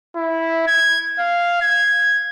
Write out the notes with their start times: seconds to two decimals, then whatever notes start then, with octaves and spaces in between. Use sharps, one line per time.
0.16 E4
0.67 G#6
1.19 F5
1.62 G#6